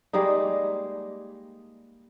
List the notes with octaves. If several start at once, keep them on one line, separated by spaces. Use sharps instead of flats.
G3 G#3 A#3 D#4